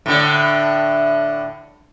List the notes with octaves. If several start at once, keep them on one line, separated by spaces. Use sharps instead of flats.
A2 D3